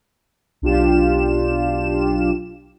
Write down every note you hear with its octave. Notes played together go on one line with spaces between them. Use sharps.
B1 D4 F4 G4 E7